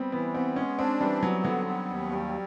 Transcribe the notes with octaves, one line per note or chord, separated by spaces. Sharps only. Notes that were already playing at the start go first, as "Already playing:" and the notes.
Already playing: G3 B3 C4
E3 B3
B3 C4
G#3 C#4
C4 D4
E3 G3
F#3 B3
D3 F#3
B3
D#2
G3